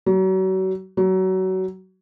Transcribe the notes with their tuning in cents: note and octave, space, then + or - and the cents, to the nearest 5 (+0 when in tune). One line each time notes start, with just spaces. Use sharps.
F#3 +35
F#3 +25